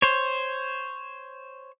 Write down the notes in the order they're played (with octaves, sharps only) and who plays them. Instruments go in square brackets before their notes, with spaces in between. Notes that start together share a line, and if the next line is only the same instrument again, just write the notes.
[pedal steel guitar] C5 C#5